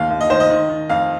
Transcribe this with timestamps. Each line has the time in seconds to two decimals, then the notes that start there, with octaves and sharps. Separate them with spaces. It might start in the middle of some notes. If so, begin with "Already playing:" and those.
Already playing: D#2 D#3 F5
0.10 D#2
0.21 D#5
0.30 D#3 C5
0.40 D#5
0.50 D#3
0.69 D#3
0.89 F2 F5